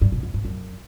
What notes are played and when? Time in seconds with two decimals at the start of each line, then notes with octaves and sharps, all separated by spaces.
0.01 G2
0.12 B2
0.23 E2
0.34 G#2
0.45 F#2